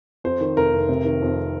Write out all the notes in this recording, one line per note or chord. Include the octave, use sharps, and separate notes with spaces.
F2 C5
D#3
F1 A#4
F1
C3
D#3
F2